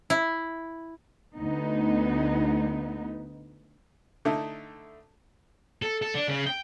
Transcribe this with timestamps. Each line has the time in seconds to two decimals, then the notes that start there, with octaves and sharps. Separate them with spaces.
0.10 E4
1.36 D2 B3 D#4
4.25 D3 A3 D#4 E4
5.82 A4
6.02 A4
6.15 D4
6.29 C#3
6.46 G5